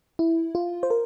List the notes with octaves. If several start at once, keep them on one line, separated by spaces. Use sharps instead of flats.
E4
F4
C5
A#4